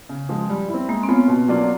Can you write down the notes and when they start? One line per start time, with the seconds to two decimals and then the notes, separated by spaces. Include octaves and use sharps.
0.09 C#3
0.29 F3 G#3
0.49 G3
0.69 E4
0.74 C4
0.89 G#3 A#3
1.03 C4
1.09 B3 C#4 F4
1.28 B2
1.48 F#3 A#3 D4 F4